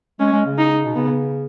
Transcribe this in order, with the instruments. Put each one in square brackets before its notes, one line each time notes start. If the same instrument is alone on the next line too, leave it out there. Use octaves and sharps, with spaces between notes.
[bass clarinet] G#3 [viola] C#4
[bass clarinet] G#3
C#3
[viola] D#4
[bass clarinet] B2
[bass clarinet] C#3 [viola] B3